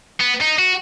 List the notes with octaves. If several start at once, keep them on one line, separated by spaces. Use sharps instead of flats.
B3
D#4
F#4